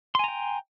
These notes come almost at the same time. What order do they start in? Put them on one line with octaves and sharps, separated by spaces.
C6 G#5 A#5 G5